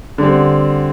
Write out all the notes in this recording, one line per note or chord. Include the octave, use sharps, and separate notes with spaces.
D3 G3 C4